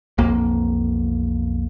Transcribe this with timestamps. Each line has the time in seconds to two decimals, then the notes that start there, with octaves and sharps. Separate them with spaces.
0.18 B1 F2 A#3